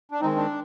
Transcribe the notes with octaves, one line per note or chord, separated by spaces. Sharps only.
D4
D#3 G#3 C4 D#4
D4